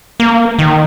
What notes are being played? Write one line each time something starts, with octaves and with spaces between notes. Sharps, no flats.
A#3
D#3